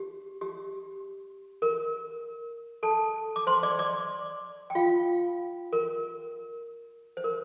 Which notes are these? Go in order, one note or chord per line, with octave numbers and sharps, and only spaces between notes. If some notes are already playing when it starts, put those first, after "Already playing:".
Already playing: G4
G4
A#4
A4 A5
D6
C5 C6
D5 D6
D5 D6
G5
F4 F5
A#4
C5
A#4